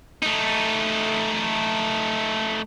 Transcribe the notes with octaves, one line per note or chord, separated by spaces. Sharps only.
A3 D#4